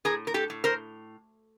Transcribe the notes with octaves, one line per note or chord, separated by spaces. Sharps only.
A2 G#4 A#4
A#4
G4 A4
A2
A#4 C5